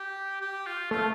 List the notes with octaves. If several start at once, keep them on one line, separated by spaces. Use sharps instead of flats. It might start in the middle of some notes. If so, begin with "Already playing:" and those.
Already playing: G4
G4
F4
A3 F4